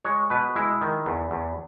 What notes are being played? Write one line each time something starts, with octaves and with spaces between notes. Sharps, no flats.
G#3 C#5
B2 B4
G#3 E4
D#3
E2
E2